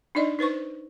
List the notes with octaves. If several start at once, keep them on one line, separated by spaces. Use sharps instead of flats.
D4 D#4 D5 D#5
D#4 B4 C5 C#6